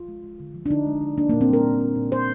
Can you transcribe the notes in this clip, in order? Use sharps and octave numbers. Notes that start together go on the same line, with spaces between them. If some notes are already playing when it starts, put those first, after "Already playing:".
Already playing: F4
G#3
G#3
D3
F3
D4
D3 D#4
G#3
D3
A#3 D4
A#3
A#2
C4
G3 A#4
A#2
A#3
A#2
A#3 C5